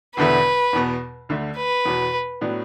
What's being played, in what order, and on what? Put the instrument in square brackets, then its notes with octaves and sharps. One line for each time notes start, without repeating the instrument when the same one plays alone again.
[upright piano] E1 E2 D3 B3 E4 [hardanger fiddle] B4
[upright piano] E2 B2 B3
D2 D3 A3
[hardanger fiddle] B4
[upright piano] E2 B2 F#3 B3
A2 F#3 B3 D4